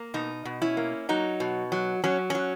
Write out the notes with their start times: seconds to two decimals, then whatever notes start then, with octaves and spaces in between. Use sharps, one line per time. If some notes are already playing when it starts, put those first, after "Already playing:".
Already playing: A#3
0.14 B2 D#4
0.45 B2
0.62 C#4 E4
0.77 A#3
1.09 F#3 D#4
1.40 B2
1.72 F#3
2.04 F#3 C#4
2.30 F#3 C#4